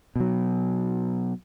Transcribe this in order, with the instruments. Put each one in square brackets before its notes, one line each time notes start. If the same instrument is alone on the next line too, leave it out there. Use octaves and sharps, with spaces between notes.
[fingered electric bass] B2 F#3